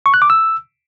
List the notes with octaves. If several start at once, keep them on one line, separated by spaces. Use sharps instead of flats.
C#6
F#6
D6
E6